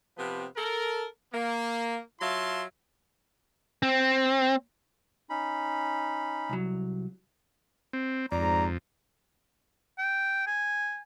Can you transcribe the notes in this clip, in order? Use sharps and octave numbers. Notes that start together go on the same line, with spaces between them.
C3 F3 B3 C4 G4 B4
A4 A#4
A#3
F#3 F4 E5 F5 A5 C6
C4
C#4 D#4 B5
C2 F#3
C4
F2 G#2 D5 A#5
G5
G#5